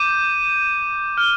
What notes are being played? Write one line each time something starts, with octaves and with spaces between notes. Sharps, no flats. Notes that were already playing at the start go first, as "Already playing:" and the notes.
Already playing: D6 G6 D#7
F6